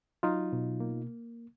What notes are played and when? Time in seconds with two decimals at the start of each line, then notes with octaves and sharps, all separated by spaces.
0.23 F#3 D#4 F4
0.52 B2
0.80 A#3